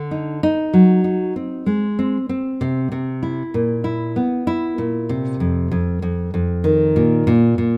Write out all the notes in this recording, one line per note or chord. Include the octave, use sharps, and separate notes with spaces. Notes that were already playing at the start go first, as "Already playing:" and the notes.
Already playing: D3
D#4
D#4
F#3
D#4
C4
G#3
C4
C4
C3
C3
E4
A#2
E4
B3
E4
A#2
C3
F2
F2
F2
F2
D#3
A#2
A#2
A#2